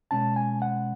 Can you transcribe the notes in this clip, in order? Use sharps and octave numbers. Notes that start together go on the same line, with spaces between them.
B2 G#3 C#4 A5
G#5
F#5